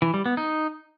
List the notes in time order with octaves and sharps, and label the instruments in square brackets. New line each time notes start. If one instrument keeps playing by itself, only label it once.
[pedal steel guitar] E3
G3
B3
D#4